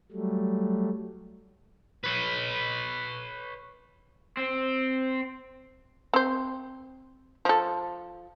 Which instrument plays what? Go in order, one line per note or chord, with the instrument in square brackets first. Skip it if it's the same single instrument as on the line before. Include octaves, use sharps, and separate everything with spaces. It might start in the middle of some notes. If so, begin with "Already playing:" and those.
[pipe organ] F#3 G3 A3
[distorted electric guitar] B4 C#5
[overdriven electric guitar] C4
[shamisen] C4 C5
F3 A4